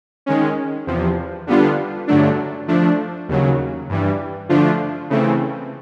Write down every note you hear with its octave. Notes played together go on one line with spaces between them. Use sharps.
D#3 G#3 C#4
E2 C3 F3
D3 G3 B3 D4 F4
G2 D3 F#3 A3 D4
F3 A3 D4
D#2 C#3 F#3
G2 E3 G3
D3 F3 A3 D4 F4
C#3 E3 A3 C4